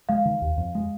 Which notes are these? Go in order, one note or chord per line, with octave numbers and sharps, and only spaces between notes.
G#3 F5
D#3
D#2
F2
G#3